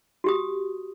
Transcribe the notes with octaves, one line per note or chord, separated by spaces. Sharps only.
F#4 G4 D#6